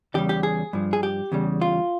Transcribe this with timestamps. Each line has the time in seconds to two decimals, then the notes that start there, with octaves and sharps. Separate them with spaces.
0.14 E2 C#3 G3 G4
0.29 G4
0.43 G#4
0.73 G2 F3
0.93 G#4
1.03 G4
1.32 E2 C#3 G3
1.62 F4